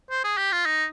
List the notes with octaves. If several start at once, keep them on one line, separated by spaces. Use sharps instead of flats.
C5
G#4
G4
F4
D#4